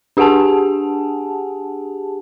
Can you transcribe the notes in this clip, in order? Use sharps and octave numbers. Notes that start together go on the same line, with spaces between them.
D4 G4 G#4 F#5 G#5 A5